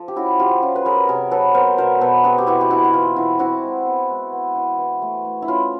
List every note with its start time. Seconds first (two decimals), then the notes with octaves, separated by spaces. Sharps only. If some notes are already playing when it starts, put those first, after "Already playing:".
Already playing: F3 A4
0.08 G4
0.16 C#4 E4 F#4
0.39 F3 F4 G4
0.62 C#4 F4
0.76 B4
0.85 F#3 G#4 A#4
1.08 C3 G#4 A#4
1.31 F#3 A4 B4
1.54 B3 A#4 C5
1.78 B2 A#4 C5
2.01 B2 A4 B4
2.24 C4 F#4 G#4
2.38 G4
2.47 B2 E4 F#4
2.61 G4
2.70 E3 E4 F#4
2.84 F#4
2.94 E3 F4
3.16 E3 E4 F#4
3.39 C4 E4 F#4
3.63 G#3
3.86 B3
4.09 G#3
4.32 B3
4.56 E3
4.78 E3
5.02 A3
5.25 A3
5.42 E4
5.48 C#4 F4